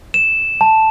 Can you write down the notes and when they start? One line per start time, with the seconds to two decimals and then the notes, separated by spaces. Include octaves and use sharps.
0.14 E7
0.61 A5